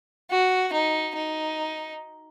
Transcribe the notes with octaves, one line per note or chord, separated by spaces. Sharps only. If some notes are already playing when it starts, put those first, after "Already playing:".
F#4
D#4
D#4